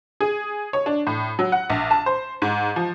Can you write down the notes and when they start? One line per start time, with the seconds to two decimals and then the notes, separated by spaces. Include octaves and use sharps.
0.20 G#4
0.73 C#5
0.86 D4
1.07 A2
1.39 F#3
1.52 F#5
1.70 A#1
1.91 A5
2.06 C5
2.42 G#2
2.76 F3